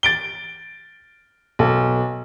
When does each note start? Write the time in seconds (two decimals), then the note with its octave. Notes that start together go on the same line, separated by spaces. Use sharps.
0.03 A6 D7 G7
1.59 B1 A4